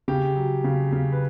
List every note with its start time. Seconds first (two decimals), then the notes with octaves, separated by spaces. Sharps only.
0.08 C#3 G4
0.36 F#3
0.64 C#3
0.92 C#3
1.12 B4